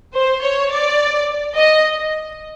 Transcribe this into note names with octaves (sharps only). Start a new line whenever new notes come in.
C5
C#5
D5
D#5